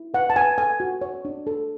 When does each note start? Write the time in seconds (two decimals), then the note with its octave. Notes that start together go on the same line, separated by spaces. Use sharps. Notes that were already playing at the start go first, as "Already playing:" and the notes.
Already playing: E4
0.14 B4 F#5
0.30 A5
0.36 B4 G#5
0.58 A4 G#5
0.80 F#4
1.01 C#5
1.25 D4
1.47 A4